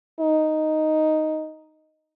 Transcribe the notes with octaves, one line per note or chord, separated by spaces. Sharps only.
D#4